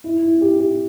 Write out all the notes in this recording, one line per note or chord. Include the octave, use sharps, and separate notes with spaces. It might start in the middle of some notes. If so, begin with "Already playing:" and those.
E4
E4
G4
G4